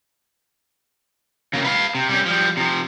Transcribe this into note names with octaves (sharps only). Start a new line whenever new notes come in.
C#3 A#3
B4 F5
C3
G3 C#4
F3 G3
C3 F3